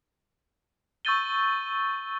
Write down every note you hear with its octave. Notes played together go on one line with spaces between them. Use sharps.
C#6 E6 G6 A6 D#7 G7